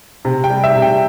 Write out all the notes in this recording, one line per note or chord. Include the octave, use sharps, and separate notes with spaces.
C3
G5
G3
E5
C3
G5